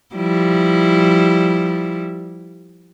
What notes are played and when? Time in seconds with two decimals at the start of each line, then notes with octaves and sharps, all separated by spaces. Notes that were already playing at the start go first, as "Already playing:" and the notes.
0.15 F3 G3 E4